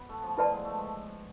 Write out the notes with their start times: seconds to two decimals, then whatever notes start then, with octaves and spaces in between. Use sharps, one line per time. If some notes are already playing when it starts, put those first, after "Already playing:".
Already playing: B3
0.09 A3
0.23 F3
0.38 F3 E4 B4 D5 A5
0.53 G#3
0.65 A3
0.78 G#3